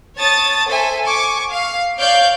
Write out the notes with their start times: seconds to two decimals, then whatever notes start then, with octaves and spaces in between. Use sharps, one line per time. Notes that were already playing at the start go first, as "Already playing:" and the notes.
0.17 C#5 A5 D#6 A6
0.66 A4 C5 E5 G#5
1.03 G#5 C#6 D6
1.49 F5
1.99 C#5 D5 F5 G6 D7